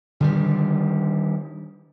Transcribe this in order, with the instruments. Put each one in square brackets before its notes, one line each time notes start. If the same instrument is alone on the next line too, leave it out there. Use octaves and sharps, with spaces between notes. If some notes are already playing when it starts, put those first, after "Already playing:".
[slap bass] D3 D#3 G3